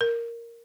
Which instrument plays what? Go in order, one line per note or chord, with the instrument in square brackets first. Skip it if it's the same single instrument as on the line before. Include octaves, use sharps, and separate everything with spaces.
[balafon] A#4